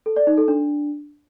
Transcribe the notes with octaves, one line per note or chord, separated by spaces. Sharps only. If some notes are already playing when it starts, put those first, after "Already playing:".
A4
D5
D#4
A4
D4